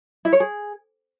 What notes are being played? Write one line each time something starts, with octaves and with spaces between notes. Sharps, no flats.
E4
C#5
G#4